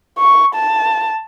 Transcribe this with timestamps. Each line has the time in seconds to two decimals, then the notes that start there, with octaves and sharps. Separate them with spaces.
0.18 C#6
0.55 A5